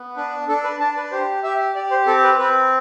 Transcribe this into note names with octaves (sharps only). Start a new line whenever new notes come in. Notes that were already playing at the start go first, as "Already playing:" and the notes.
Already playing: B3
D4 B4
D4 A4
B4
D4 A5
B4
G4 C5
G4 E5
G4 D5
C5
C4 A4
B4
C4 B4